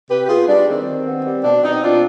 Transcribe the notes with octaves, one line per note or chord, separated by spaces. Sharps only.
C3 G4 B4
G4
B3 F4 G#4
G3 D4
D#3 C4
D#3
B3
G3
B2 D4
B2 C4 D#4
C4 D4 F4